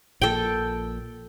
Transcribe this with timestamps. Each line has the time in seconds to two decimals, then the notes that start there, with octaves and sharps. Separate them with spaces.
0.22 A#1 A#2 A4 G5